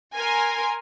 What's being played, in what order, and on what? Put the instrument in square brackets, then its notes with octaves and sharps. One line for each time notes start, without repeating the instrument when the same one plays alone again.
[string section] A#4 G#5 C6